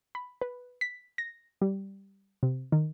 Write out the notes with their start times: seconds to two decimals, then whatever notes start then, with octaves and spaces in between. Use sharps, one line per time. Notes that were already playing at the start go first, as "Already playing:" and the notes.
0.15 B5
0.41 B4
0.81 B6
1.18 A#6
1.61 G3
2.43 C3
2.72 D#3